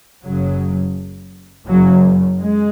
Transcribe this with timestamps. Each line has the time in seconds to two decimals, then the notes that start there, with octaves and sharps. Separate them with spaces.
0.24 F#1 F#2 C#3 F#3
1.68 F#1 F#2 C#3 F#3
2.39 G#3